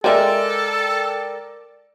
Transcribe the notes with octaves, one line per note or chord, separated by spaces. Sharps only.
G#3 A4 A#4 D5 E5 G5